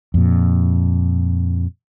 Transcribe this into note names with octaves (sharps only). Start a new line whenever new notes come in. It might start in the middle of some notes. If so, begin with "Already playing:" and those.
F2 A#2